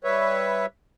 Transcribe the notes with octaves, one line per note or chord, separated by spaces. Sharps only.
G3 B4 C#5 E5